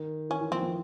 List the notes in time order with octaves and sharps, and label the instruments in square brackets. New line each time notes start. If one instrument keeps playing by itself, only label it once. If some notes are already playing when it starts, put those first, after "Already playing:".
Already playing: [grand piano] D#3
[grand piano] E3 [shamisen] C#4
[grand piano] E3
[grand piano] F3 [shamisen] C4
[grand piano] F3